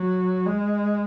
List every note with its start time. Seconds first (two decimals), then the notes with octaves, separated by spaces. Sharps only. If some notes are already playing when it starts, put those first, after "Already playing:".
Already playing: F#3
0.46 G#3